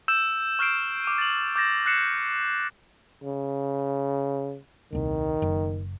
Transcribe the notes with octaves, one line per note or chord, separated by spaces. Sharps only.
E6 G6 E7
C#6 F6 G6 C7 D7
D6 D#7
A6 F#7
D6 G6 A6 A#6 E7
F#6 A#6 C7 C#7 E7
C#3
D#1 C2 D#3
F#1